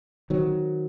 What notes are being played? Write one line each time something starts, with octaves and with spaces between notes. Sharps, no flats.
D#3 F#3 C4